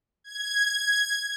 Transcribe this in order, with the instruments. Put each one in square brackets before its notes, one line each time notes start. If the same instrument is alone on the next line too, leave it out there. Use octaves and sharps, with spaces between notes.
[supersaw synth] G#6